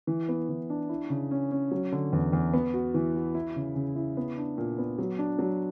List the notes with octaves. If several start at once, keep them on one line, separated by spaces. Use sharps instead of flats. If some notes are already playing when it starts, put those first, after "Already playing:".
E3
B3
E3
D4
E4
C#3
C#4
C#4
F#3
D3
E2
E2
B3
F#4
E3
F#4
E4
C#3
C#3
E4
B3
D4
A#2
B3
F#3
D4
F#3